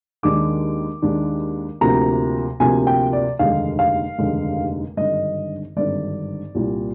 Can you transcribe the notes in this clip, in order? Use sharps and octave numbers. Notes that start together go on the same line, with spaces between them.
D#2 D#3 G#3 D4 D6
D#2 D#3 G#3 D4
D2 C3 F3 A#3 A#5
D2 C3 F3 A#3 G#5
G5
D5
F1 D#2 D3 G#3 F5
F5
F1 D#2 D3 G#3
G#1 G2 D3 D#5
G#1 G2 D3 D5
C2 A#2 G3